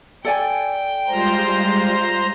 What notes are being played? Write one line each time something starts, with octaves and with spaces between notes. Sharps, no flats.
A4 D5 G5 G#5
G3 G#3 F4 C5 A#5